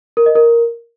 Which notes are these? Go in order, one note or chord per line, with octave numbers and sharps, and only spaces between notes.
A#4
D#5
A#4